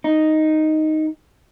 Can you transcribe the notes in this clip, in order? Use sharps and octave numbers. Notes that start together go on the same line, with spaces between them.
D#4